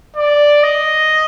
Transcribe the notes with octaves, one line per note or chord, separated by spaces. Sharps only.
D5
D#5